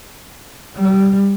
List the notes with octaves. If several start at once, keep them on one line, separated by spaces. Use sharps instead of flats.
G3